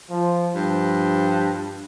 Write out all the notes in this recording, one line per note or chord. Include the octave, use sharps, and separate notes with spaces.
F3
G2 F3